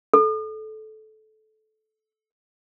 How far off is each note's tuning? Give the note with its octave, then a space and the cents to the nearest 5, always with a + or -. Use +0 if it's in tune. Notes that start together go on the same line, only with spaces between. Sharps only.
A4 -20